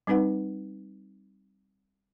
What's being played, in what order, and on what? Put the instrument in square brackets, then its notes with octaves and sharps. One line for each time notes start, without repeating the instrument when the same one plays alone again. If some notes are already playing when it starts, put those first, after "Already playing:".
[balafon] G3 C4 D#4 B4 F#5